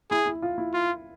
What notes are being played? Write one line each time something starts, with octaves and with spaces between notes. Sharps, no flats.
E4 G#4
E4
F4
E4
F4